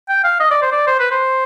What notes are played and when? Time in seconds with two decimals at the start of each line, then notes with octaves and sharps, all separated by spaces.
0.09 G5
0.24 F5
0.40 D#5
0.51 D5
0.62 C5
0.72 D5
0.87 C5
0.99 B4
1.11 C5